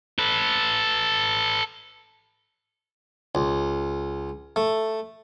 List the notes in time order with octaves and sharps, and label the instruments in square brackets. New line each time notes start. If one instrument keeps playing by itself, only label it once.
[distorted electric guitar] A4 B4
[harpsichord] C#2
A3